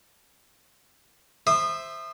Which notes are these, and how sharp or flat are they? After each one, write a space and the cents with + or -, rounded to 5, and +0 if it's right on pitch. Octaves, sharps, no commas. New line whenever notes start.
C5 +0 E5 +0 D#6 -30